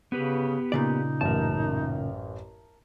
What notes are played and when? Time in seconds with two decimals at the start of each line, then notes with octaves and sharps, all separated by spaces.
0.12 C#3 B3 G4 B4
0.72 A#2 C#3 D#4 D5
1.21 A1 F#2 A#4 A5